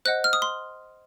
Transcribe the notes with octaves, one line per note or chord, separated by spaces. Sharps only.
C5 D#5 F#5 F#6
F6
D#6
C6